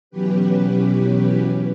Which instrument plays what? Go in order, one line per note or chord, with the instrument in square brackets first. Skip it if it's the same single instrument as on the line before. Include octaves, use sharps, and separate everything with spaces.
[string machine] B2 E3 F#3 C#4 G4 B4